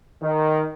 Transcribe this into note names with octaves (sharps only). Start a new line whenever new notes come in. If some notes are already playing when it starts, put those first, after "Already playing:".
D#3